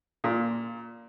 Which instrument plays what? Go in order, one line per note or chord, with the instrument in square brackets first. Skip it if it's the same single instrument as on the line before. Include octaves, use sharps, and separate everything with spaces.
[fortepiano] A#2